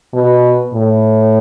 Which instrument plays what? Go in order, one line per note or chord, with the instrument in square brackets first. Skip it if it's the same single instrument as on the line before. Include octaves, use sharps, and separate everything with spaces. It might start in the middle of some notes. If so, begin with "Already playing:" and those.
[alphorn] B2
A2